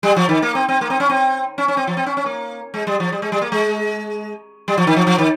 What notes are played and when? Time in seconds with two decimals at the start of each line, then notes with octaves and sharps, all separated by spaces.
0.03 G3
0.16 F3
0.29 D#3
0.42 A#3
0.55 C4
0.69 C4
0.81 A#3
0.90 C4
1.00 C#4
1.09 C4
1.58 C#4
1.68 C#4
1.77 C4
1.87 F3
1.97 C4
2.06 C#4
2.17 C#4
2.26 A#3
2.74 G#3
2.87 G3
3.00 F3
3.12 G3
3.22 G#3
3.32 G3
3.41 A#3
3.52 G#3
4.68 G3
4.77 F3
4.87 D#3
4.96 F3
5.07 F3
5.18 D#3